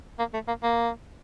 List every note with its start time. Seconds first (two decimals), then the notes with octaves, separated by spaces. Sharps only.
0.19 A#3
0.33 A3
0.48 A#3
0.63 A#3